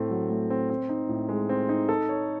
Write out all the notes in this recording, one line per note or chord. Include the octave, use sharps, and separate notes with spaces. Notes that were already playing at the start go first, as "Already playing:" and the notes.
Already playing: A2 A3 C4
F#3
A3
C4
C4
D#4
A2
G#3
C4
D#4
A4
C#5